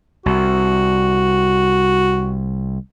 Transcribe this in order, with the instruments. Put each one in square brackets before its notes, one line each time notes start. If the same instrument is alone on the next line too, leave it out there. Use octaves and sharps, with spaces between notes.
[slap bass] C2 [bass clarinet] F#4